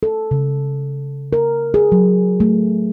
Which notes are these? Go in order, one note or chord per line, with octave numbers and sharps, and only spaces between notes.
A4
C#3
A#4
G#4
F#3
A3